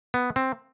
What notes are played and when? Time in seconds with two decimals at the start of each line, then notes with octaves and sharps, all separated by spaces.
0.14 B3
0.36 C4